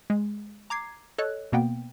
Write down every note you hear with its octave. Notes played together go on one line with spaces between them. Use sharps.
G#3
A#5 D6 G#6 C7
A4 C#5 D#5 F#6
B2 A#3 B3 G5